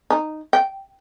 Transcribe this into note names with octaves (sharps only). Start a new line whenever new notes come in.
D#4
G5